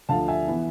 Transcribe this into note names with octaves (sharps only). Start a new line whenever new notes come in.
D2 D3 F3 F5 A5
E5 G#5
E3 B3